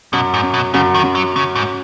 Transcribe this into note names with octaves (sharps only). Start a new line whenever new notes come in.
F#2 B2
G#2
C#4
B2
F#2 C#3
D#3
F#2
F#3
C#3 C#4
G#2